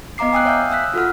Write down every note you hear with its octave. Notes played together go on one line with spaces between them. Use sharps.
B3 D#5 F5 A#5 D6 C7
G5 G#5 D#6 E6 F#6
C#5 E5 F5 G#5 F6 G6
D#6 E6 F#6 B6
F4 F#4 A4 F#5 F6